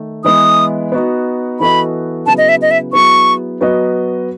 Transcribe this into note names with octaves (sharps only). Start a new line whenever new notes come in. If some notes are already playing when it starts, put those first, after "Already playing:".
Already playing: D#3 A3
E3 G#3 B3 E4 B4 D#6
B3 D#4 F#4
E3 B3 F#4 A4 D#5 B5
C#3 F#3 B3 E4 G#4 A5
D#5
E5
D#5
E5
F#3 B3 E4 G#4 C#6
F#3 B3 F#4 B4 D#5